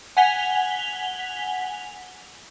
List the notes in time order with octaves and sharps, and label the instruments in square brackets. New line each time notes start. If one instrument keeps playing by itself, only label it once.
[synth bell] F#5 G#5 B6 F7 G7